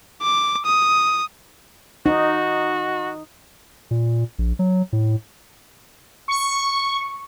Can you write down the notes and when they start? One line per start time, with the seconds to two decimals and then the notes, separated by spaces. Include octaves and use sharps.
0.22 D6
0.66 D#6
2.06 D#4 F#4
3.91 A#2
4.39 A#1
4.59 F#3
4.93 A2
6.28 C#6